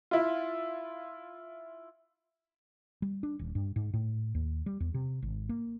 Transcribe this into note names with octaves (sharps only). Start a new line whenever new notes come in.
E4 F4
G3
D4
D#1
G2
G#2
A2
D#2
G3
E2
C3
G#1
A#3